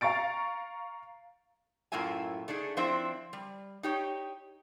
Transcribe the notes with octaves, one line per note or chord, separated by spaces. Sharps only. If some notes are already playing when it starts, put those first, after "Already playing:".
F5 A#5 C#6 A6 D7
F#2 A2 A#3 F4 E5 G#5
A3 D4 D#4 G#4
F3 C4 D4 E4 C5 E5
G3
D#4 G4 C#5